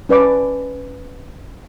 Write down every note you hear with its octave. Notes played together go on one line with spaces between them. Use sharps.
C#4 B4 D5 D6